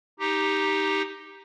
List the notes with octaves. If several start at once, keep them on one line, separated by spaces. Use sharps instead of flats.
D#4 G4